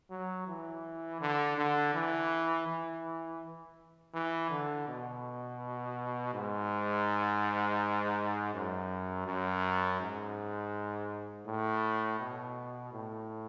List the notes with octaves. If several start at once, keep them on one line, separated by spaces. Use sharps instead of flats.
F#3
E3
D3
D3
E3
E3
E3
D3
B2
G#2
F#2
F#2
G#2
A2
B2
A2